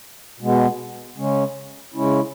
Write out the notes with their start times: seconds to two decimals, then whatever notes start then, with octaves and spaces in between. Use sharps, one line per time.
0.40 B2 G#3 B3
1.17 C#3 G#3 C#4
1.94 C#3 G#3 C#4 E4